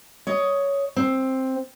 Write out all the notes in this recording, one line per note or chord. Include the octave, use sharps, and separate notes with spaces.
C#5 D#5
C4